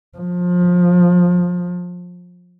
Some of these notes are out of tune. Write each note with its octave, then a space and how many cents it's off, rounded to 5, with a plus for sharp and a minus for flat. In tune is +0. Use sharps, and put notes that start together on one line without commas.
F3 +25